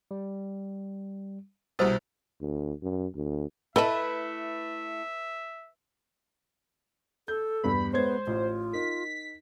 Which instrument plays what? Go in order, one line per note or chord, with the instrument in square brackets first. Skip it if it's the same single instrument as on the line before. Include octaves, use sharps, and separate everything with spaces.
[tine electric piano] G3
[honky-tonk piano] C2 B2 [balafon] G3 G4 [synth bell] C5 E6 A6 [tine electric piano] D#6
[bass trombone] D2
F#2
D2
[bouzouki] A3 E4 [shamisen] A4 D#5 A5 [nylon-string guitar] B4 [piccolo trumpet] E5
[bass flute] A4 [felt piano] G6
[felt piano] E2 G2 B3 [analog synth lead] B5
[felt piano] G#3 C#5 G#6 [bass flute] B3 [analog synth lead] C5
[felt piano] A1 [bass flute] F4
[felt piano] D#4 A#4 [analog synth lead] B6